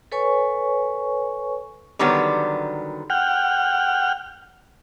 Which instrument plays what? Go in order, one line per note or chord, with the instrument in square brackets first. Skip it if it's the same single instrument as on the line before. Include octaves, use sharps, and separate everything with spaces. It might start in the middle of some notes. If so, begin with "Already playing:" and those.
[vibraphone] A4 B4 C#5 G#5 C#6
[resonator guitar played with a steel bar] D3 D#3 F#3 G3 B3
[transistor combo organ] F#5 G5 F6